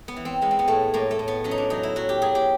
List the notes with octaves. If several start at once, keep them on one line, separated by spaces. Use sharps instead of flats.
B3
E3
C4
G#3 B3
C4
B3
A2 A3
A2 A#3
A3
A2
B3
F#3 C#4
D#4
D4
F#3 D#4
E4
F#3 F#4
G4
F#3 G#4
G4